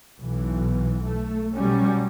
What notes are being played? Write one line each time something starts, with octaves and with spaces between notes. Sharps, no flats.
B1 E3
A3
B2 F#3 G3 C#4